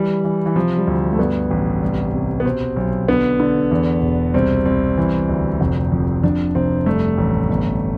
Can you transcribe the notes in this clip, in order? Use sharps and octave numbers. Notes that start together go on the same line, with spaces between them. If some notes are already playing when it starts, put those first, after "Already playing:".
Already playing: E3 G3
E3
E3
C3 F3
G3
D2
A3
G2 B3
A1
C2
C3
B3
B2 C4
B1
D3 B3
D3
E2
E1
C2 C4
C2 C4
E3
D2
F1
F2
F2 D4
F1 C4
G2 A3
A1
G1